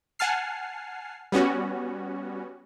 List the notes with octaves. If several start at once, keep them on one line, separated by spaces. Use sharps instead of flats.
F#5 G#5 A5 F6 C7
G3 B3 C#4 F#4